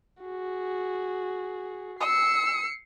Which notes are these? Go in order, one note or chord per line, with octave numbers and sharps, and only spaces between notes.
F#4 G#4
E6 C7 C#7